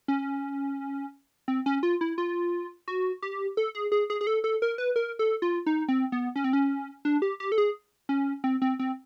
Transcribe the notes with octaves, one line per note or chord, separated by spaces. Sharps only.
C#4
C4
C#4
F4
E4
F4
F#4
G4
A4
G#4
G#4
G#4
G#4
A4
A4
A#4
B4
A#4
A4
F4
D#4
C4
B3
C#4
C4
C#4
D4
G4
G4
A4
G#4
C#4
C4
C4
C4